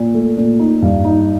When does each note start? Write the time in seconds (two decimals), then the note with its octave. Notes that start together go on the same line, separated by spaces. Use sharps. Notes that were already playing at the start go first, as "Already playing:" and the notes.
Already playing: A#2
0.14 A3
0.38 A#2
0.59 D#4
0.82 G2
1.05 D#4